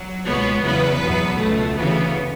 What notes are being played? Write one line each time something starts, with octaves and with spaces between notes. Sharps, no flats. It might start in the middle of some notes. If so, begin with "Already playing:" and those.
Already playing: F#3
C#2 B2 G#3 B3 C#5
E2 C#3 F#3 B3 B4
E2 B2 F#3 B3
C#2 B2 A3
D2 C#3 E3 B3